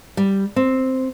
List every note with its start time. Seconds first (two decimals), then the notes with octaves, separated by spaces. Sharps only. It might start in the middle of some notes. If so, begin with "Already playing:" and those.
0.17 G3
0.56 C4